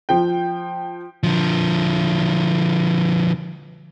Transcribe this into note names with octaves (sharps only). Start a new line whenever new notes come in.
F3 G5
D3 F3